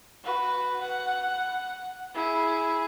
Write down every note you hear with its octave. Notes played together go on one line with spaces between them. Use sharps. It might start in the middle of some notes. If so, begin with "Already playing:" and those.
F#4 B4
F#5
E4 G#4